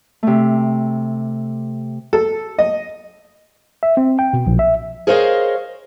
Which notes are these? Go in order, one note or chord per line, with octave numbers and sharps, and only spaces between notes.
C3 A3
A4
D#5
E5
C4
G5
B2
A#1
E5
G#4 A#4 C5 C#5 D#5 F5